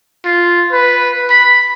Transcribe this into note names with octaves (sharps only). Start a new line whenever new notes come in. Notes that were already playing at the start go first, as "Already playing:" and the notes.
F4
B4
B5